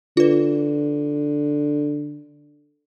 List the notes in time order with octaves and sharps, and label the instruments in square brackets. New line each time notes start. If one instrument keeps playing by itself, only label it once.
[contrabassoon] D3 [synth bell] F4 B4